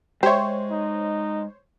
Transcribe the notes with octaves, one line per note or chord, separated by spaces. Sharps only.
G#3 G4 C5 C#5 E5
D#4